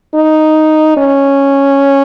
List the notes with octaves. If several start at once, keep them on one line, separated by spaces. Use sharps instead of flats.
D#4
C#4